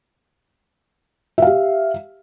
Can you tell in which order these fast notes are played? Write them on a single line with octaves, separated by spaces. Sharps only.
E5 F5 G4